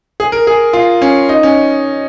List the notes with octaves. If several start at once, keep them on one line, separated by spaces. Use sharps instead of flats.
G#4
A#4
G#4
F4
C#4
D#4
C#4